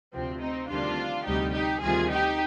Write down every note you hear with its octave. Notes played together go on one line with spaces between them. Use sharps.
D2 C3 F3 C4
C4 D#4
D2 C3 D#3 G3 D4 F4
D2 C3 G3 D#4 G4
D#4 G4
D2 C3 D#3 G3 F4 G#4
D#4 G4